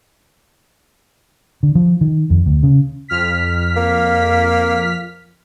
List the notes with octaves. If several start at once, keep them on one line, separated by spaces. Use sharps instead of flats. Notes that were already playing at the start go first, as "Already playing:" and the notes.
D3
F3
D#3
F2
D2
C#3
F2 F6 B6
A#3